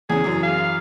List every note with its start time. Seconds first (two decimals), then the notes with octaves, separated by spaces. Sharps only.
0.10 E2 C#3 G#4
0.24 F#2 E3
0.43 F5